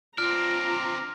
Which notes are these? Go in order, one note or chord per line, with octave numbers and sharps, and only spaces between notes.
C4 D4 F4 A#5 F6